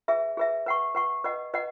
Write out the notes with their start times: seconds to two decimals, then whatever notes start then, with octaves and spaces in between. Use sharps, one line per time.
0.08 G#4 B4 E5
0.37 G#4 B4 E5
0.66 B4 F#5 C#6
0.95 B4 F#5 C#6
1.24 B4 D#5 F#5
1.54 B4 D#5 F#5